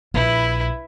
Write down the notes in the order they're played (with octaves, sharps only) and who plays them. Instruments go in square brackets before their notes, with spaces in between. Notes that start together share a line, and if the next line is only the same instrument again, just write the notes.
[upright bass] A#1 [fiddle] E4 B4